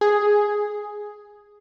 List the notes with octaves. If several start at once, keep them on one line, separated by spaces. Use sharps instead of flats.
G#4